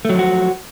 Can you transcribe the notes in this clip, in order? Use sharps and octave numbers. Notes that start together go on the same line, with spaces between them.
F3 F#3 A3 F#4